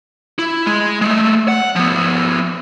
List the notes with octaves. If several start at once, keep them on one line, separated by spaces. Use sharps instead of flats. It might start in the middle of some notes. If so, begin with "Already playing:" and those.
E4
G#3
G#3 A3
F#5
F3 B3